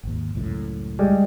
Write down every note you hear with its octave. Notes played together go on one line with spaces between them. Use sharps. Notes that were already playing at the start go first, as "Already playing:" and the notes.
G#1 D#2
C#2 F#2 A2
G3 G#3